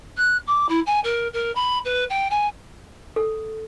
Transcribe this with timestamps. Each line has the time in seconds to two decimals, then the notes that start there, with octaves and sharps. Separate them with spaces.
0.17 F#6
0.47 D6
0.69 E4
0.87 G#5
1.04 A#4
1.33 A#4
1.55 B5
1.85 B4
2.10 G5
2.31 G#5
3.16 A4